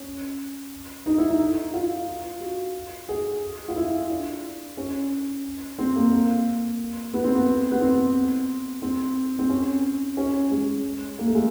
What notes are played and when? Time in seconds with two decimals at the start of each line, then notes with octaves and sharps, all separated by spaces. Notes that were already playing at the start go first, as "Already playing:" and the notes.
Already playing: C#4
1.06 D#4
1.18 E4
1.30 D#4
1.73 F4
2.40 F#4
3.09 G#4
3.68 F4
3.76 E4
4.10 D4
4.77 C#4
5.79 C4
5.96 A#3
6.12 A#3
7.14 B3
7.24 C4
7.35 B3
7.71 B3
7.81 C4
8.82 C4
9.39 C4
9.49 C#4
10.17 C#4
10.50 G#3
11.19 A#3
11.26 A3
11.35 G#3